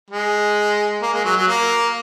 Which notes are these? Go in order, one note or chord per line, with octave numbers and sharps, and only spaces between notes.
G#3
A#3
G#3
F#3
F#3
A#3